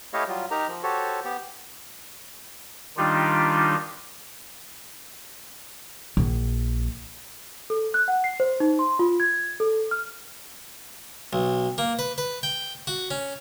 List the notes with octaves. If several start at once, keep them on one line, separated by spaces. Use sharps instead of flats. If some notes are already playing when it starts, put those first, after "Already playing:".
A3 E4 G4 C#5 D#5 F5
F#3 G3 F4
D#4 G4 A#4 A#5
F3
F#4 G4 A4 C5 C#5
B3 G4
D#3 G3 D4 D#4 F4 G4
A#1
A4
F#6
F#5
C7
C5
D#4
C6
F4
G#6
A4
F6
B1
A#3
B4
B4
G5
F#4
C#4